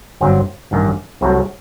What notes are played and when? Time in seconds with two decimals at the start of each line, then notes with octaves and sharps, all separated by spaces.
0.21 G1 G2 F#3 C4
0.71 A1 G2 D#3
1.21 C2 C3 F#3 A3